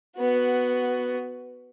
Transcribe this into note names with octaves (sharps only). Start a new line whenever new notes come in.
B3 F#4